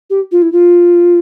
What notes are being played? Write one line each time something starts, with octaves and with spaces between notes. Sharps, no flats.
G4
F4
E4
F4